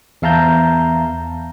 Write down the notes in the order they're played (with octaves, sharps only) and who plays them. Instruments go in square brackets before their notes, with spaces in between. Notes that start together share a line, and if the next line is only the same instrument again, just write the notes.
[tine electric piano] E2 E5 F5 A5 A#5 G6